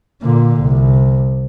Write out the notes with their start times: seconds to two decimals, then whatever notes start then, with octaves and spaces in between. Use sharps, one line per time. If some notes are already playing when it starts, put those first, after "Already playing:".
0.22 A#2 D3
0.62 C2